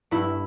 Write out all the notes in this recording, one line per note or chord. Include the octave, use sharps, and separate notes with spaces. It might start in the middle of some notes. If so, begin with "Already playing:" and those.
G2 E4